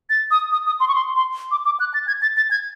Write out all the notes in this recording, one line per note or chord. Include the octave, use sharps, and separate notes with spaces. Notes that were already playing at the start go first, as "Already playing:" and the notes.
A6
D#6
D#6
D#6
C6
C#6
C6
C6
D6
D6
F#6
A6
G#6
A6
A6
G#6